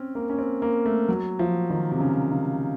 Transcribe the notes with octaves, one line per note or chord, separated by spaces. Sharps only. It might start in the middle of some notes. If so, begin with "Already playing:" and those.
Already playing: C4 C#4
A#3
C#4
C4
A#3
A3
F#3
F3
D#3
C3
C#3
C#3